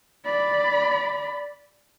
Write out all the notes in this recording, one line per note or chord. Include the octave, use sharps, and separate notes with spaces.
D5 B5